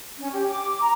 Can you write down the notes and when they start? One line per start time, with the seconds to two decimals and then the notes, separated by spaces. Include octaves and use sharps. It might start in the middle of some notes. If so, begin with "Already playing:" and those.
0.18 C#4
0.32 G4
0.48 D6
0.81 A#5